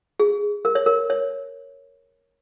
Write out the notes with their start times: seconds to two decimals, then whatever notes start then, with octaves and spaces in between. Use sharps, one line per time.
0.20 G#4
0.65 A#4
0.75 C#5
0.86 A#4
1.10 C#5